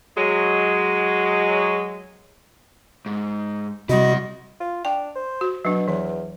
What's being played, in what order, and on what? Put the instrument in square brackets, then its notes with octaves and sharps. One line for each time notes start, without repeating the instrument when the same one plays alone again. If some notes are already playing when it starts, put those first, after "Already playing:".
[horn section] F#3 G#3
[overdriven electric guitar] G#2
[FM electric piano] C3 [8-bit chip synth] G3 F#4 [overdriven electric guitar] E4 F#5 [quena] D#5
[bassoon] F4
[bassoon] D4 [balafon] G5
[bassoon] C5
[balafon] F#4
[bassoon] B2 [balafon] F#3 D4
[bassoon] E2 [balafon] E3